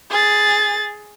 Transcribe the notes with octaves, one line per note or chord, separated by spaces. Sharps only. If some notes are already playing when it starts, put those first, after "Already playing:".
G#4 A6